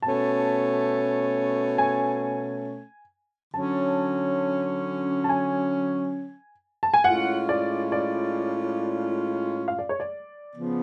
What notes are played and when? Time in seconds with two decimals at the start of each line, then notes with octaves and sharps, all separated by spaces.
0.02 B2 A3 C#4 A5
1.78 G#5
3.54 D3 F#3 C#4 A5
5.24 A5
5.29 G#5
6.83 A5
6.94 G#5
7.04 A2 G#3 C#4 F4 F#5
7.49 D5
7.92 D5
9.68 F5
9.79 D5
9.89 C#5
10.00 D5
10.55 C#3 F3 B3